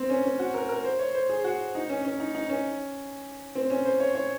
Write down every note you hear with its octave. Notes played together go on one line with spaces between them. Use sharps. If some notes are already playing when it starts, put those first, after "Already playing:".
Already playing: C4
C#4
C#4
F#4
A#4
A#4
C5
C#5
C5
G#4
F#4
D#4
C#4
C#4
D#4
D#4
C#4
C4
C#4
C5
C#5
C#5